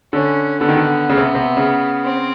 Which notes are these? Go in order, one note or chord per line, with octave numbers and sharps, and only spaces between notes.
D3 C#4
D3 B3
D#3
D3
C#3
C3
C3
C#3
C4